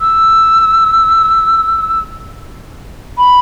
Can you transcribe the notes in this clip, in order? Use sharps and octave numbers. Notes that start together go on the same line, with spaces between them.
E6
B5